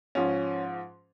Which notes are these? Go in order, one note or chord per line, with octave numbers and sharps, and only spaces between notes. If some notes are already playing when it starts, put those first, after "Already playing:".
G#2 F3 C#4